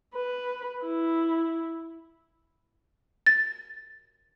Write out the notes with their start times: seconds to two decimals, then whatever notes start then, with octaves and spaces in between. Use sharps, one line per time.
0.15 B4
0.85 E4
3.26 A6